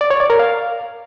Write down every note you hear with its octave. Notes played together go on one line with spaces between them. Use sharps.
D5
C#5
D5
A#4
F5